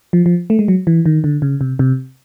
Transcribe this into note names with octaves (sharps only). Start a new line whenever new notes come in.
F3
F3
A3
G#3
F#3
E3
D#3
D3
C#3
C3
C3